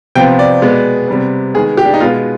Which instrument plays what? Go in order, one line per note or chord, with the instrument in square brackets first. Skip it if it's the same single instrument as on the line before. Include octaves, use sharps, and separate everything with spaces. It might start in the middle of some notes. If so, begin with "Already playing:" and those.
[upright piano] C3 F3 B3 G5
D5
B2 G#3 B3
C3 G3 B3
D#3 G#3 B3 G#4
G4
D4
D#4
B2 G#3 B3 F4